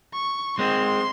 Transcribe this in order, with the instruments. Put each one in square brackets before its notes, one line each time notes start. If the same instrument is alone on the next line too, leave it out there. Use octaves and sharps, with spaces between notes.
[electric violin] C#6
[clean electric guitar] G#3 C4 [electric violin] C6